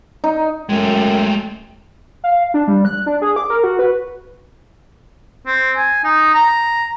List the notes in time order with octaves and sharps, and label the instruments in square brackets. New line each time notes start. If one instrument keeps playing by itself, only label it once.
[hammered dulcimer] D#4
[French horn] F#2 [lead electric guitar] G#3 A3 [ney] G5
[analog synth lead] F5
D4
G3
F#6
D4
G#4
D6
A#4
F#4
B4
[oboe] C4
G#5
D#4
A#5